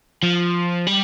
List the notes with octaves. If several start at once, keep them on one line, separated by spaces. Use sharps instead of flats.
F3
G3